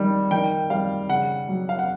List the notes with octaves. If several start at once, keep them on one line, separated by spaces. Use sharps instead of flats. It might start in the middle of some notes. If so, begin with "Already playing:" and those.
Already playing: D#3 G3
D#3 G5
G3 F5
C#3 F#5
F#3
F5
F#5